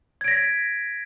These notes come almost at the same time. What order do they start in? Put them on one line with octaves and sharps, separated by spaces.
G#6 D7 A#6 B6